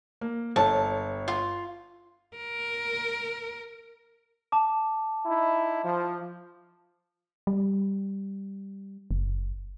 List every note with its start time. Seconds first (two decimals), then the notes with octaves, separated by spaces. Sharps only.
0.21 A#3
0.56 G1 A4 C#5 A5
1.28 F4
2.36 A#4
4.52 A5 D6
5.26 D#4 E4
5.83 F3
7.47 G3
9.11 F#1